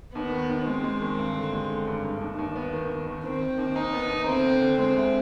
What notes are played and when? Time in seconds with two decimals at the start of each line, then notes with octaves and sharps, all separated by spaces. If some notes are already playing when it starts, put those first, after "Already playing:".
0.15 D#2 B3
0.32 D#3
0.50 D#2
0.66 G#3 C4
0.84 G#3
1.01 D#3
1.18 G2
1.36 D3
1.52 G#3
1.70 D3
1.87 G2
2.04 G2
2.21 D#2
2.39 D#2
2.55 B3
2.73 D#3
2.90 D#3
3.07 D#3
3.24 D#3 C4
3.42 D#3
3.58 D#2
3.76 D#2 D#4
3.93 B3
4.10 D#2
4.27 D2 C4
4.44 D3
4.62 D3
4.78 G#3 C4
4.96 D2